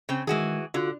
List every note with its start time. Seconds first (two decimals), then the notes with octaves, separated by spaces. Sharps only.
0.09 C#3 C4
0.27 D#3 E3 G#3 F#4 G#4
0.74 D3 F4 F#4 F#6